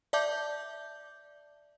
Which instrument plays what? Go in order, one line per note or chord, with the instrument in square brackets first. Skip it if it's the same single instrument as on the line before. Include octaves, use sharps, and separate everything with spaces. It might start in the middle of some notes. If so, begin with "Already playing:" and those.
[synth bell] D5 E5 A5 D6 G6